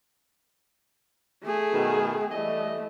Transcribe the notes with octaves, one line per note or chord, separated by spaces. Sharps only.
A3 G#4
B2 D#3
E3 G3 A3 D#5